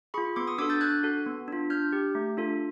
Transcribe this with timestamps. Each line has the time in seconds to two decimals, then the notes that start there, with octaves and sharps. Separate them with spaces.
0.14 G#4 B5 C#6
0.18 F4
0.36 B3 C6 D6
0.47 C#6 D#6
0.58 D4 F#4 A4 D6 E6
0.70 G6 A6
0.81 D4 F#6 G#6
1.03 F#4 A4
1.26 B3
1.48 D4 F4
1.70 D4 F6 G6
1.93 G4
2.15 A3
2.37 D4 F4 A4